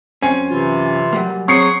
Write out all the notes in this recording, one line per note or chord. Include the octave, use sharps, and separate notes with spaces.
F#2 C4 C#4 G#5
C3 E3 F4
F#3 G3 A#3
F#3 C4 G#4 C#6 C7 C#7